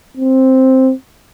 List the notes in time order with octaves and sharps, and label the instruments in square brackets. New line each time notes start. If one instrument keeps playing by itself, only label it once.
[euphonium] C4